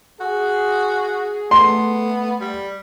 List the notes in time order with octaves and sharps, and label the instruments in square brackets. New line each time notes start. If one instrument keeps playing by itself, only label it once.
[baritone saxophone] F#4 [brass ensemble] G#4
[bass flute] A3 [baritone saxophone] B3 [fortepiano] C6
[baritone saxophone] G3